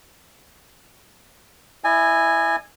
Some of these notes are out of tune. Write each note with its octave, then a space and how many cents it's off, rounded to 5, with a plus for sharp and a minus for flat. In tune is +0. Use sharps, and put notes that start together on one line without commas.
E4 +0 D#5 -40 G#5 -5